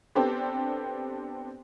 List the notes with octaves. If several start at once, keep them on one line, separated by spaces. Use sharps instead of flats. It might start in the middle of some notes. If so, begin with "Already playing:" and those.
B3 C4 D4 G4 A4 C5